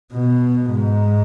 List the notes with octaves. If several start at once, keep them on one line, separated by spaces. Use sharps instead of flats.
B2
G#2